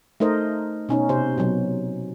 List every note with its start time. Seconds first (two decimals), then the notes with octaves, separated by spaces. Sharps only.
0.20 A3 D#4 A#4 C5 D#5
0.89 B2 C#4 D#4
1.09 C3 C5
1.38 B2 F#3